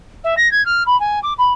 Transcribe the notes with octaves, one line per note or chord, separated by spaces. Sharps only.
E5
A#6
G#6
F6
B5
G#5
D6
B5